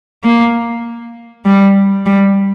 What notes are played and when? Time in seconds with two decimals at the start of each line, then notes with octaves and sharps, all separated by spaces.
0.24 A#3
1.46 G3
2.06 G3